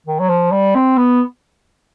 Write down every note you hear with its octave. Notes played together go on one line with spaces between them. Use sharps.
D#3
F#3
F3
G3
C4
B3